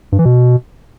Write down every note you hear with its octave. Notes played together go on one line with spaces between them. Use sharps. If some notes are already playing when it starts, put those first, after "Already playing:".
G2
E3
B2